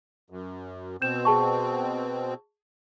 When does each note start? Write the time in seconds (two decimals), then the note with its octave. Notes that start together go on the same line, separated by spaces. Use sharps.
0.30 F#2
1.02 B2 C4 G6 E7
1.25 G#4 A5 C#6